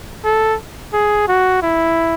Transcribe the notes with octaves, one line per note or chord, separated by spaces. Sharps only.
A4
G#4
F#4
E4